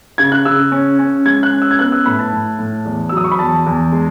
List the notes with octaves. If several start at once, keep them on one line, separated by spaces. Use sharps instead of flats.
C#3 G#6
F#6
C#3 E6
C#4
C#4
G#3 G#6
F#6
C#4
E6
G#6
B3 F#6
E6
A2 B5
A5
A2
A2
E2
E6
F#3 D#6
C#6
B5
E2 A5
E2
G#3